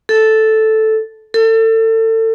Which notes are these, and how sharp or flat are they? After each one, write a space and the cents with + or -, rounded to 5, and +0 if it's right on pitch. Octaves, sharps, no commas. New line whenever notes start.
A4 -5
A4 +30